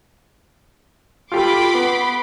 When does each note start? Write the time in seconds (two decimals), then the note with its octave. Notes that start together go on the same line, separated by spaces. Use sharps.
1.32 F4 G4 A4 B5 C6 D6
1.74 B3